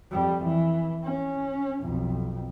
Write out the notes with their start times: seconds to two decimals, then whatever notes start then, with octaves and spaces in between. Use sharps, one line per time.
0.11 F2 G3
0.45 E3
1.04 C#4
1.82 B1 F2